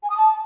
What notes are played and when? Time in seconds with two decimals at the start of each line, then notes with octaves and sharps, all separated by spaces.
0.03 G#5
0.10 D#6
0.17 A5